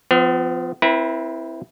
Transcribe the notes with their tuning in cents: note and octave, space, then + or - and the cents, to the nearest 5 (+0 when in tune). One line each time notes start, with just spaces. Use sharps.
F3 +0 B3 +45
C4 +0 E4 +0 B4 -40